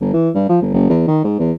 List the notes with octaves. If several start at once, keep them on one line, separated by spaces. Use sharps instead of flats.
G1
E3
G2
F3
G1
F#1
E2
D#3
G#2
E2